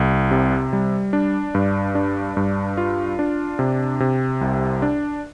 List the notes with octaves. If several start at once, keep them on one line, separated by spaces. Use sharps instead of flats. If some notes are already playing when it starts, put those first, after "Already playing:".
Already playing: C2
C3
G3
D4
G2
D4
G2
F4
D4
C3
C3
C2
D4